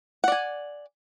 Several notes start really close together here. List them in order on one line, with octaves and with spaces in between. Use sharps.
F#5 D5 G#5